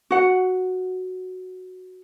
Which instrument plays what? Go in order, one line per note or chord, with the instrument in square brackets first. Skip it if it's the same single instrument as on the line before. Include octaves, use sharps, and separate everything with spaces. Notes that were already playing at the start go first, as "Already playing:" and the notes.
[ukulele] F#4 F#5